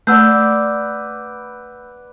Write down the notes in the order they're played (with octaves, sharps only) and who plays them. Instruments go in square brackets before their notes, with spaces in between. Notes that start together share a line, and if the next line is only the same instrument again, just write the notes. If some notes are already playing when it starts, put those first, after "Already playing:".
[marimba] A3 [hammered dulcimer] B4 D5 [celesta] F#5 E6 G6